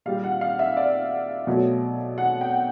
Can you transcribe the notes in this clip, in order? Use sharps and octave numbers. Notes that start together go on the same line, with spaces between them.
A#2 G3 F5
F#5
F5
E5
D5
B2 F#3 A3
F#5
G5